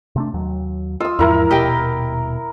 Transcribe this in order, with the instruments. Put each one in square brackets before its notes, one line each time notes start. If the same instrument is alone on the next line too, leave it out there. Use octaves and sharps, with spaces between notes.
[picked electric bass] C3 A3 D4
D#2 F#3
[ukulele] F4 [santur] D#6 E6
[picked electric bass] E2 G#2 F3 [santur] E4 A#4
[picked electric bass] D#1 B2 [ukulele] G4 D#5 G5